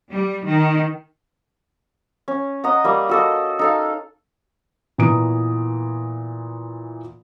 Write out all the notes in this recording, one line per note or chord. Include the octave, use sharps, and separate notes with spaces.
G3
D#3
C#4
D#5 F#5 A#5
G3 A#3
F#4 A4 D#5
D#4 A4 F5
A#2 E3 B3 A#5 D#6 D7